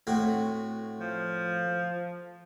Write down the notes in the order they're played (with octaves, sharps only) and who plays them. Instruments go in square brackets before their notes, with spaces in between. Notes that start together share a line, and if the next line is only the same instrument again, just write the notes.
[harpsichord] A2 C4 F#4
[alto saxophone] F3